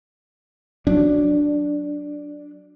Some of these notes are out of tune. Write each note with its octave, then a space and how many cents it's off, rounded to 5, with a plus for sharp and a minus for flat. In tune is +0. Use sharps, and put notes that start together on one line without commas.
F#3 +0 D4 +0